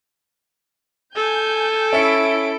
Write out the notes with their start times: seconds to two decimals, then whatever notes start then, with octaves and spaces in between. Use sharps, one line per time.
1.16 A4 G#5 G6
1.93 C#4 E4 E5 C#7 D7